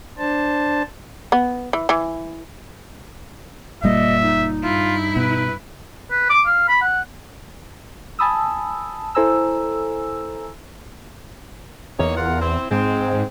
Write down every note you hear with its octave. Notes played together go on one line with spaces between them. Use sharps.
D4 C5 A5
B3
E3
E3
F#1 A#2 G3 A#3 D#5 E5
D#4
G2 E4 F4
B2 B4
B4
D6
F5
B5
F#5
G#5 A5 B5 D#6 E6
E4 A4 C5 G#5 A#5 E6
E2 A#3 D#4 C#5
F4 A#4 F#5
C4 E4
G#2 G#3 C4
G#2